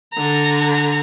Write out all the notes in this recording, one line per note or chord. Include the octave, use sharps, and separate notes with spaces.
D3 A#5